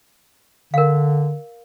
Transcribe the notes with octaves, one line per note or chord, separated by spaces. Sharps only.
D3 A#4 F5